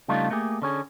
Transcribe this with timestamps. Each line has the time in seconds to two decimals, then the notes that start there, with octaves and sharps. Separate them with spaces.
0.08 C#3 G3 A3 D4 D#4 F4
0.30 A3 A#3 G4 G#4
0.62 D3 C#4 G#4